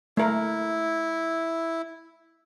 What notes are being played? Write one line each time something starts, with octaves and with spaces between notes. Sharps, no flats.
A3 E4 A#4